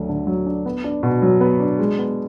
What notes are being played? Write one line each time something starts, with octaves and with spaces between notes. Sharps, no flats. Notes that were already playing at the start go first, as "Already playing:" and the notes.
Already playing: D2 F#3 D4
D3
F#3
D4
B3
D4
B2
F#3
B3
D4
G#3
B3